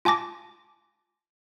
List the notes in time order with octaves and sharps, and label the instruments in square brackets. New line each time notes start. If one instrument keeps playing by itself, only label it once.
[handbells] F4 G#5 A5 D6 A#6